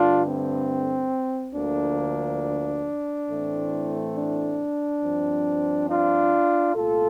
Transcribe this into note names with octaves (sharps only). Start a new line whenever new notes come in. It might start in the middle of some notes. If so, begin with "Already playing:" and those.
Already playing: G2 D3 A3 D4 F4
C4
D2 D3 F3 A#3 D4
A2 E3 A3 C4
D4
G2 F3 C4
D4 F4
C2 A#2 A3 F4 A4